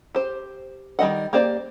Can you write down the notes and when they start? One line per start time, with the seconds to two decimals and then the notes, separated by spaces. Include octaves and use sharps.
0.15 G4 C5
0.99 D#3 G3 D#5 F#5
1.33 A#3 G4 C5 D5